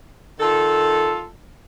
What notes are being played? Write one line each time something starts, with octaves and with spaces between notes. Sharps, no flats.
D#3 F4 A4